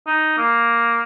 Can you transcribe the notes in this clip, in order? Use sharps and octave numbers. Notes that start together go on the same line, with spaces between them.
D#4
A#3